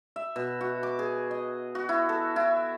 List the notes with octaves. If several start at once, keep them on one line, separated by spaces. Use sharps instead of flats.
E5
B2
F#4
D6
G#4
D#5
F#4
E4
A4
E4